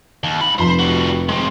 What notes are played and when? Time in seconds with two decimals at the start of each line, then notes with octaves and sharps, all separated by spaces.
0.23 D#2
0.41 G#2 B5
0.59 F1 F3 C5 B5
0.79 G3 F#4
1.29 G#3 C4 C6